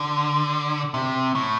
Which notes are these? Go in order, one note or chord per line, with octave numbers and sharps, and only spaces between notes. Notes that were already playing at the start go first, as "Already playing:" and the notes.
Already playing: D3
C3
A2